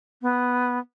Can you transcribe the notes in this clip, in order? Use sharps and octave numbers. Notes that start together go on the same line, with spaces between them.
B3